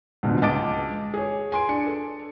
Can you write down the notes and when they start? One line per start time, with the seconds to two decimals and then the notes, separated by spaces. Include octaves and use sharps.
0.23 D2 G#2 B2 D3 F3
0.42 C#2 D#5 A5 D6 A6 D7
1.14 G#4 C#5
1.52 G#5 C6 D7
1.69 D4 C#7
1.87 A4